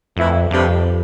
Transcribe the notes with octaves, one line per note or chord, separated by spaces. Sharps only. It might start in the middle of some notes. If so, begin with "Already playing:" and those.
F2 E3 A3 E4
F2 C3 G3 D4 G4 B4